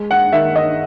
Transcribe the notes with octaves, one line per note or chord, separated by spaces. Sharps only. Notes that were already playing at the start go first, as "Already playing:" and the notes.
Already playing: G#3
F#5
D#3 E5
D#5